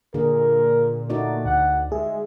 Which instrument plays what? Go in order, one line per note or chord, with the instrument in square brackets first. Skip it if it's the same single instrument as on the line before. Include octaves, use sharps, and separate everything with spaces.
[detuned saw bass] A#2 [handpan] D3 G#4 [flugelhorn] A#4
[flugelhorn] A3 [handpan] D#4 F#4 D5
[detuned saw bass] D2 [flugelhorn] F#5
[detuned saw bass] G#3 [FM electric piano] G#4 [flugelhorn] E5